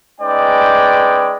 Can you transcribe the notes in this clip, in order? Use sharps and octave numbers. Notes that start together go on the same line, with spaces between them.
G#3 C#4 D#4 B4 D5 G5